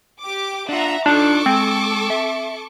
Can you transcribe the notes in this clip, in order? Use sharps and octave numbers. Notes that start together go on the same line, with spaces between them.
G4 D6
D4 F4 E5 F#5 A#5
D4 D#4 F4 A4 D5 C#6 D6
G#3 C4
E5